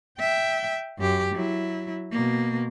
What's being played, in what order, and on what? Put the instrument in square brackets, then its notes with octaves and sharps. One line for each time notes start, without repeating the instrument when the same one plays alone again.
[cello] E5 G5
F#2 G4
F#3 E4
B2 A#3